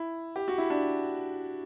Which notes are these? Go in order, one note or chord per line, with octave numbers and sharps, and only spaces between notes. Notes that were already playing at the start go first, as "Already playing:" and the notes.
Already playing: E4
G4
F#4
E4
D4